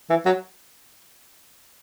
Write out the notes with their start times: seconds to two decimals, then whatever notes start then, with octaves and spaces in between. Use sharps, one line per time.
0.10 E3
0.26 F#3